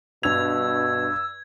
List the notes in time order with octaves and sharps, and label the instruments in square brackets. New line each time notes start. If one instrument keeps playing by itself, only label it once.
[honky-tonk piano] G2 F7 [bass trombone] B2 [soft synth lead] E6 [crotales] G#6